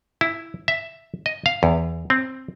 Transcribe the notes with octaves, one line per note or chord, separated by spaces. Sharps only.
E4
E5
D#5
F5
E2
C4